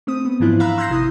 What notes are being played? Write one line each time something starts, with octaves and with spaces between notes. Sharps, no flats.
A3 C4 D#6
B3
G#2 E3 F3 D4 E4 F4
E5 F5 A#5 B5 E6 F#6
C6 E6 F#6 G6 A#6 C7
G#1 C3 E4 D#6